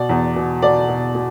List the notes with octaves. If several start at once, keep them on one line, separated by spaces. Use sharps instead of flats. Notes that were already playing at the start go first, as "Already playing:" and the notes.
Already playing: B2 D5
E2
B2
B2 D5
B2
B2